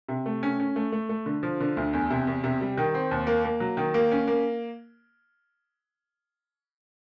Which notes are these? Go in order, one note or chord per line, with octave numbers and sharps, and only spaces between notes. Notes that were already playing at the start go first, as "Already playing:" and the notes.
C3
A3
C#4
C#4
A3
A3
A3
D3
F3
D3
D2
E2
C3
E2
C3
G3
D#3
C4
D#2
A#3
A#3
F#3
D#3
A#3
C#4
A#3